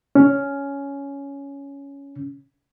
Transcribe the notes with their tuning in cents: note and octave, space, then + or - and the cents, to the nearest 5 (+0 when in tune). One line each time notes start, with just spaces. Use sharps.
C#4 +10